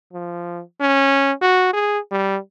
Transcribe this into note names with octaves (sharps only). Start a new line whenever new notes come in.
F3
C#4
F#4
G#4
G3